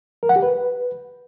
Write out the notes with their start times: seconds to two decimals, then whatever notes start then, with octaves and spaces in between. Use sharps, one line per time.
0.23 A#4
0.29 F#5
0.36 G4
0.42 B4